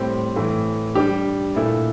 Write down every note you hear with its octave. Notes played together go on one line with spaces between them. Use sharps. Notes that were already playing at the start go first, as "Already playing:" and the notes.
Already playing: A2 G3 C4 G4
A2 E3 A3
G3 D4 G4
A#2 A3 E4 A4